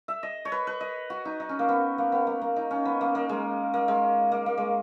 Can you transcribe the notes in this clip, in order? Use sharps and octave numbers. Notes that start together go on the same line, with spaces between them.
E5
D#5
C#5
B4
B4
D#5
F#4
D#4
D#4
C#4
A#3
B3
A#3
B3
A#3
A#3
D#4
C#4
B3
A#3
A#3
G#3
A#3
G#3
A#3
A#3
G#3